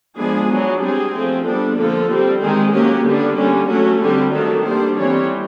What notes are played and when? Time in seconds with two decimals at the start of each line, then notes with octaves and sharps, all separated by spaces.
0.17 F3 G#3 B3 D4 G#4
0.49 F#3 B3 D4
0.81 G3 C4 G#4
1.13 F3 A3 C4
1.45 G3 B3 D4 A4
1.77 D3 F3 A#3 A4
2.09 G3 C4
2.41 D#3 G#3 C4 G#4
2.73 F#3 A#3 C#4 G4
3.05 D3 G3 B3 D4
3.37 D3 G3 A#3 C#4
3.69 F#3 A3 C#4 F#4
4.01 D3 G3 C4 G4
4.33 D#3 F#3 A3 D4 A4
4.65 G3 A#3 D4 C5
4.97 E3 G3 C4 C#5